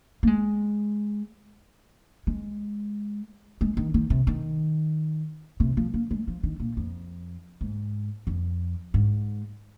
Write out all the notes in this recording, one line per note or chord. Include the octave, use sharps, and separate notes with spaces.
A#3
G#3
G#3
G#3
D#3
D#3
C3
D#3
C3
F3
A#3
G#3
F3
D#3
A#2
F2
G#2
F2
G#2